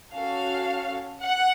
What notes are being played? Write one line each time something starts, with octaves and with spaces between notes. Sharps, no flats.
C#4 F#4 A4 F5
F#5